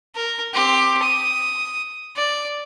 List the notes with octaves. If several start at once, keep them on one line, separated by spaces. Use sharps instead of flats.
A#4
C4 G4
D#6
D5